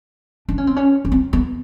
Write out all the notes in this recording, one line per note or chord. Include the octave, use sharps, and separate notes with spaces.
D4
C#4
C4
C#4
C#4
C4
B3